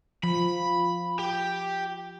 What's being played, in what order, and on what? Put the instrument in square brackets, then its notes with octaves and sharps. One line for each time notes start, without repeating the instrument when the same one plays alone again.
[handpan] F3 [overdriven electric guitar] B5
[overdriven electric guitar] G4